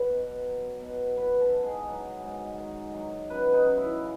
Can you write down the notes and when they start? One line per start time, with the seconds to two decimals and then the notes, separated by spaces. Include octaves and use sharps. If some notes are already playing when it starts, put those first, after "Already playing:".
Already playing: F#3 B4
0.10 B2
0.46 F#3
0.81 B2
1.17 F#3 B4
1.40 A4
1.52 G#2
1.64 G#4
1.87 F#3
2.23 G#2
2.58 D#3
2.94 F#3
3.30 F#2 B4
3.53 D#4
3.65 F#2
3.77 E4
4.01 C#3